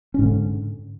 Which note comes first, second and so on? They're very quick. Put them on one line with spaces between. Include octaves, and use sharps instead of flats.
C#4 G#2 D3